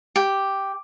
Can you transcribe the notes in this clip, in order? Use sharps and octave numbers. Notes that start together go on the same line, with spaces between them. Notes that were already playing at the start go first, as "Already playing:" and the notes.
G4